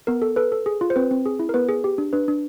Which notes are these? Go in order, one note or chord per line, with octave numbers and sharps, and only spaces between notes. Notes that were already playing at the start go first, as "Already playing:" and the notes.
B3 A#4
A4
A4 B4
A4
G#4
F4
C5
C4 B4
C4
G#4
E4
A#4
B3 B4
G#4
G4
D4
D4 B4
D4